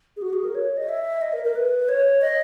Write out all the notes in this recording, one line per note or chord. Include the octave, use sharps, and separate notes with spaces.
G#4
F#4
G#4
A#4
C#5
D#5
E5
D#5
A#4
A#4
B4
C#5
D#5